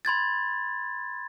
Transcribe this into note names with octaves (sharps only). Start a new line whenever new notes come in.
B5 C6 G#6 A6